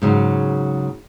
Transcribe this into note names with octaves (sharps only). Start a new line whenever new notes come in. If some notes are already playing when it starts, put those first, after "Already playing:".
G#2 C#3 F#3